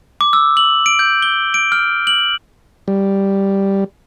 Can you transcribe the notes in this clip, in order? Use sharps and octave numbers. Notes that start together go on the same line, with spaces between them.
D6
E6
F#7
D7
G6
G7
D7
F6
F#7
G3